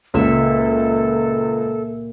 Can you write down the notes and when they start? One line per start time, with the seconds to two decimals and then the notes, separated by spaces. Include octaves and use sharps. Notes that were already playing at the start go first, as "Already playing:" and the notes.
0.14 C#2 A#2 A4 E5